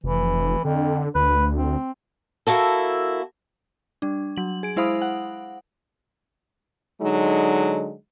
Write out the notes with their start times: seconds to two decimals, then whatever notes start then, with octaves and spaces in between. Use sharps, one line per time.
0.04 F1 E3
0.65 F2 D3
1.15 D2 B4
1.56 C4
2.47 A#3 E4 F#4 A4
4.02 G3 D4
4.36 F#3 F#7
4.63 G#4 D7
4.76 G#3 E4 C5 F5 B5 D#6
5.02 F#5
7.01 D3 F#3 G#3 D#4